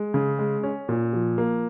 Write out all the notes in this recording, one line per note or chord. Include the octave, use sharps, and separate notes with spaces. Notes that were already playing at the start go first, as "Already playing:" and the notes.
Already playing: G#3
C#3
G#3
C#4
A#2
F3
A#3